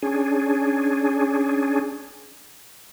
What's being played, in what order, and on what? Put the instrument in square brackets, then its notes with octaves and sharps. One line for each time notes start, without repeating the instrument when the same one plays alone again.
[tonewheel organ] C#4 D4 G#4